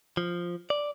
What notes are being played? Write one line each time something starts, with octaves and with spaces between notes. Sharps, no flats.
F3
D5